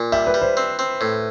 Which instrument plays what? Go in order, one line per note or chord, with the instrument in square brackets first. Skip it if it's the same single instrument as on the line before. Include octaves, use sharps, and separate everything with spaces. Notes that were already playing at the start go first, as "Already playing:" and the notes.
Already playing: [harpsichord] A#2
[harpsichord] G3 [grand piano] E5
[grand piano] B4
[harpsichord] G3
[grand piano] C5
[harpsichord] C4
C4
A2